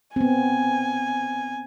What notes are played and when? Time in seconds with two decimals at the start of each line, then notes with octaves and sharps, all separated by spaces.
0.16 B3 C4 G#5